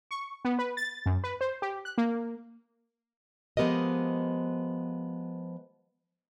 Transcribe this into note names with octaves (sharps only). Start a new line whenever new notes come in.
C#6
B3
B4
A6
F#2
B4
C5
G4
F#6
A#3
F3 G#3 B3 G4 A#4 D#5